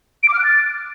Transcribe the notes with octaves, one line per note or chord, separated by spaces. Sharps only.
D7
D6
F6
F#6
A6